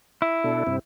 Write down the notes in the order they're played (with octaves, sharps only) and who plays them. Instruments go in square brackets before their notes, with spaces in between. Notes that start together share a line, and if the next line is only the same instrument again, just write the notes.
[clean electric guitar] E4
[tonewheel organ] B2 D4 A4
G2 C3 C4